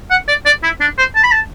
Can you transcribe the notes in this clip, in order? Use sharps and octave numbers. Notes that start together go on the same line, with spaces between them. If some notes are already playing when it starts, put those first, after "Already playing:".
F#5
D5
D5
E4
D4
C5
A5
B5
A5